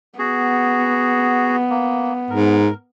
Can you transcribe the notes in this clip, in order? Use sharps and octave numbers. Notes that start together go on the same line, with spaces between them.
B3 F#4 G#4
A#3
G#2 A#4